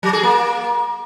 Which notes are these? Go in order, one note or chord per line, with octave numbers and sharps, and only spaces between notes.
F#3
G#4
A#3